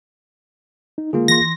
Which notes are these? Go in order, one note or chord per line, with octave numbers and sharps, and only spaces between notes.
D#4
D3 G#3 A#3 F4 G#4
E3 C6 A#6